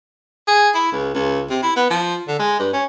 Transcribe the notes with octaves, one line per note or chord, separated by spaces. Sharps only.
G#4
E4
C#2
C#2
C3
E4
B3
F3
D3
G#3
G2
C#4